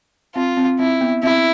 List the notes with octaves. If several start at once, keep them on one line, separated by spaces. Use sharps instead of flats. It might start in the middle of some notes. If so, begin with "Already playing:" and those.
C4 F4
C4
C4 E4
B3
C4 E4